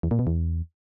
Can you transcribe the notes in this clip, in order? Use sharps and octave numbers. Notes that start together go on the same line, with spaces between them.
E2
A#2
B2
E2